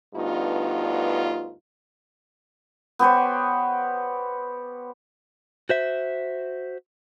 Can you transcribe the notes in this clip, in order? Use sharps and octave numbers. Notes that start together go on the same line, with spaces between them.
D2 G2 B3 D#4 F4
B3 G4 C5 C#5
F#4 C5 E5